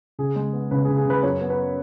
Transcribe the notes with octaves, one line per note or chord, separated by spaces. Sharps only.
C#3 G#4
G#3
B3
C#3 B4
G#4
C#3
G#4
C#3 B4
F#2 C#5
B3
B4